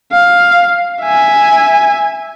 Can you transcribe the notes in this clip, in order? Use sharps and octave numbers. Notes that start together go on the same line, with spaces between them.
F5
E5 G#5